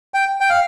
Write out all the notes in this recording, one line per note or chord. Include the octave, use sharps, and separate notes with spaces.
G5
G5
F5